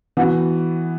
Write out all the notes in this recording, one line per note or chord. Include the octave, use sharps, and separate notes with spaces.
E3 B3 F#4